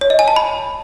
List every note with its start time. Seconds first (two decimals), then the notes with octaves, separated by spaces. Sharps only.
0.01 C#5
0.10 D#5
0.19 G#5
0.28 A5
0.36 B5